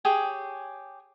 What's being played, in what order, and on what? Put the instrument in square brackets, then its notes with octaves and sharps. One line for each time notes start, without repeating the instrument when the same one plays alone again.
[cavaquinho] G4 G#4 C#5